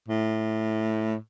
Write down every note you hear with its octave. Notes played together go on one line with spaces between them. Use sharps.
A2